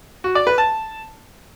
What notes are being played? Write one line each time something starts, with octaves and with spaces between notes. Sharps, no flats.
F#4
D5
B4
A5